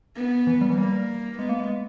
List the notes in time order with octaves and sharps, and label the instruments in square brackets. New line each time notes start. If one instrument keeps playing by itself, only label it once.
[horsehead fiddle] B3
[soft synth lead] E3
G3
E3
[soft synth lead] G3 [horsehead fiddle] A#3
[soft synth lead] G#3 [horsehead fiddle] B3
[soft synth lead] A#3
G#3